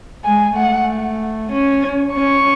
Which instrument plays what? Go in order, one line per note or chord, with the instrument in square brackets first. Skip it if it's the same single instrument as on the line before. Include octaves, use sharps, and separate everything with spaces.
[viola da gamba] G#3 [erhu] G#5
[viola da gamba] A3 [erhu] F#5
[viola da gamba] C#4
[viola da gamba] C#4 [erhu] C#6